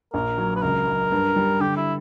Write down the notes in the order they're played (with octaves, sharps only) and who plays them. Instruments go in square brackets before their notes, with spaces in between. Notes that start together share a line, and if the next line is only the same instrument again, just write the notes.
[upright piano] A#1 [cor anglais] A#4
[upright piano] F#3
[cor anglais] B4
[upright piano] C#2 [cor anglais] A#4
[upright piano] F#3
G2
G3
[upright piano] D3 [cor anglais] G4
[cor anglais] E4